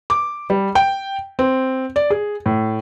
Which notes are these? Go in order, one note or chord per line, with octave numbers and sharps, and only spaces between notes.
D6
G3
G5
C4
D5
G#4
A2